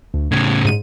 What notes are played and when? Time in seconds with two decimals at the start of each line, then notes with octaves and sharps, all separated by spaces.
0.14 D2
0.32 A2 C#3 G#6
0.65 G#2 D#7